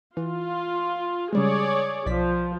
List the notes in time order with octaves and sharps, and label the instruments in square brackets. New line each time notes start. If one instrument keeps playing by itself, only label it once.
[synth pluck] E3 [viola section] F4
[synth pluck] C#3 G3 G#3 [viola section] G#4 C#5 D5
[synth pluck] B1 D5 B6 [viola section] F3